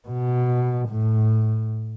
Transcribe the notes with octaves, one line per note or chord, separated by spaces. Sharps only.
B2
A2